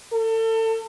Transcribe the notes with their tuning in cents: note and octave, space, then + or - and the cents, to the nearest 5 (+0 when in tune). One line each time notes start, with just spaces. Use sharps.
A4 +30